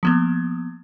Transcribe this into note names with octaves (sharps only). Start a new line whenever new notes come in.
F3 A#3 B3